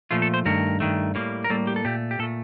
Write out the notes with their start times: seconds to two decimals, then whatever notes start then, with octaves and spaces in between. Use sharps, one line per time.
0.11 A#2 F3 A3 F4
0.22 A4
0.34 C5
0.45 G2 D#3 A3 A#4
0.80 G2 D#3 A3
1.15 A2 G3 A#3
1.44 A#4
1.50 A2 G3 A#3 A4
1.67 G4
1.76 A4
1.85 A#2 A3 G4
2.11 G4
2.19 A#2 A4
2.23 A3